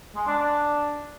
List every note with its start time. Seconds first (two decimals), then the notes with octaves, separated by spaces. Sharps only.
0.15 G#3
0.27 D4
0.39 D4